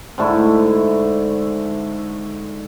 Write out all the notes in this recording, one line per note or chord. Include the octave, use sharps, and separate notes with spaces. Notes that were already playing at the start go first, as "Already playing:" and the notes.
G#2 D3 A3 E4